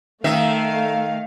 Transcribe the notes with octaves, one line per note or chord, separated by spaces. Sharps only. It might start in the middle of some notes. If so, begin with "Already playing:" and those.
D#3 A3 D#4 E5 F5